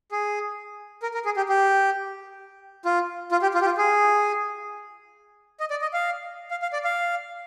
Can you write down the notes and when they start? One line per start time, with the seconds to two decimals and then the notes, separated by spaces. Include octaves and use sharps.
0.12 G#4
1.02 A#4
1.14 A#4
1.25 G#4
1.37 G4
1.49 G4
2.85 F4
3.32 F4
3.42 G4
3.54 F4
3.61 G4
3.65 F4
3.77 G#4
5.60 D#5
5.70 D5
5.82 D#5
5.93 F5
6.51 F5
6.62 F5
6.73 D5
6.84 F5